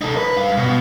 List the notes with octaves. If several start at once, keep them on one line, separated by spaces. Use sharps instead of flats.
D#4 A4
B4
G2 F5
B2